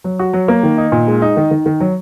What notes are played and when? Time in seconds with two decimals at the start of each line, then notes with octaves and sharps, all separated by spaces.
0.04 F#3
0.19 F#4
0.33 F#3
0.48 A#3
0.63 D#3
0.78 D#4
0.92 A#2
1.07 G#3
1.22 D#4
1.37 D#3
1.51 D#3
1.66 D#3
1.80 F#3